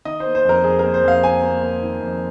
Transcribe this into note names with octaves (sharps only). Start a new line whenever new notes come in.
D#3 D#5
C5
A#3
C5
F2 A#4
F2 G#4
A#3 A#4
C5
F2 F5
A#3 G#5
A#3
A#3
D#3
F2